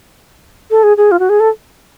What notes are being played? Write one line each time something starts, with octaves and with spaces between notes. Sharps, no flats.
A4
G#4
G#4
F4
F#4
G#4
A4